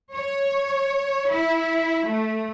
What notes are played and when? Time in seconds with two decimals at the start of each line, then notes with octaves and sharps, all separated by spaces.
0.13 C#5
1.29 E4
2.07 A3